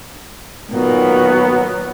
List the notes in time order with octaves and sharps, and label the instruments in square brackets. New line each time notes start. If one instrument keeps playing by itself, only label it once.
[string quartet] A#2 D#3 F#3 [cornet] B3